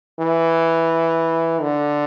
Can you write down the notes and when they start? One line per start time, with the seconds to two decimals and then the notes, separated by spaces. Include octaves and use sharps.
0.19 E3
1.62 D3